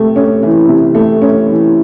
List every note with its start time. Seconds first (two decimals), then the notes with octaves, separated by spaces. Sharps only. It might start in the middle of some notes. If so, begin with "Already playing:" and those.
Already playing: C3 A3
0.16 C#4
0.43 E3
0.69 C3
0.95 A3
1.22 C#4
1.48 E3